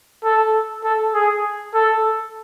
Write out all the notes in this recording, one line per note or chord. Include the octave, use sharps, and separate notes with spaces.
A4
A4
G#4
A4